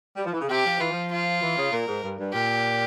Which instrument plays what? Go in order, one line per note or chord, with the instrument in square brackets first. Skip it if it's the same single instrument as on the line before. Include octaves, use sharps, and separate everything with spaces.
[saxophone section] G3
F3
E3
C#3
[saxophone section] C3 [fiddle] G4
[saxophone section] F3
[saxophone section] E3 [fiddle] F4
[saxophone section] F3
[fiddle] F4
[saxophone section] E3
C#3
[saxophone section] A#2 [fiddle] A#4
[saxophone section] G#2
G2
G2
[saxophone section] A#2 [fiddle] G4